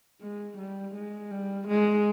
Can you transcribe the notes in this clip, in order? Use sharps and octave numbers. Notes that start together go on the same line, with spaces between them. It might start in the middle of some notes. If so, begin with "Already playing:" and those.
G#3
G3
G#3
G3
G#3